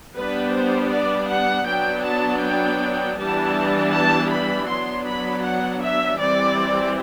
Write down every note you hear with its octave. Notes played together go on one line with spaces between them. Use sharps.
G3 B3 D4 B4
C5
D5
F#5
F#3 B3 D4 G5
A5
G5
E3 G3 B3 D4 A5
A5
B5
F#3 B3 D4 C6
B5
F#5
E5
E3 G3 C4 D5